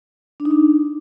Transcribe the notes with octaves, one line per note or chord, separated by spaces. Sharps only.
D4
D#4
D4